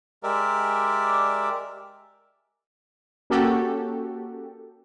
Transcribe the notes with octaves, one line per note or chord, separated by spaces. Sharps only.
G#3 G4 A#4 D5 E5
A#3 C#4 F#4 G4 A4